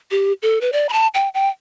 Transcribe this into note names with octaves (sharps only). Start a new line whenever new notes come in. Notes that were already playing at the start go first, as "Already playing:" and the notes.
G4
A4
B4
D5
B5
A5
G5
G5